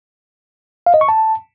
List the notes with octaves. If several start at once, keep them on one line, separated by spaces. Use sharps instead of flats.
F5
D#5
C#6
A5